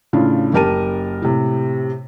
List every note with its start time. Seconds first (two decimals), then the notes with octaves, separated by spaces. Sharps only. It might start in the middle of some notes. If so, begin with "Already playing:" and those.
0.13 A2 C#3 D4 F4
0.53 F#1 G4 A#4 A5 D#7
1.22 A2 C3